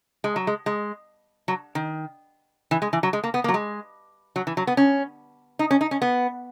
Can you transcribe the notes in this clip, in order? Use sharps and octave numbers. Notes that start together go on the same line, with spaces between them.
G#3
F#3
G#3
G#3
F#3
D#3
E3
G#3
E3
F#3
G#3
A#3
B3
A#3
F#3
G#3
F#3
E3
F#3
B3
C#4
D#4
C#4
D#4
C#4
B3